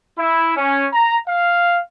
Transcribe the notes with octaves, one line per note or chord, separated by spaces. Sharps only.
E4
C#4
A#5
F5